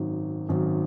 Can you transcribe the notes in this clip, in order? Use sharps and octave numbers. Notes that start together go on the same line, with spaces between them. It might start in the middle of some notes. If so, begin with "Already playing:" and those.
Already playing: G#1 F#2 D#3
G#1 F#2 D#3